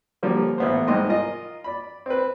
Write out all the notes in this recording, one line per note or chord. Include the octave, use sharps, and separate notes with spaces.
D3 F3 G3 A#3 C#4
A1 B3 C5
C2 G#2 B3 D#5 G5 C6
F4 A#4 D#5
D5 B5
C4 B4